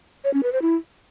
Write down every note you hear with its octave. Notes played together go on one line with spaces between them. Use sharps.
C#5
C#4
B4
C5
E4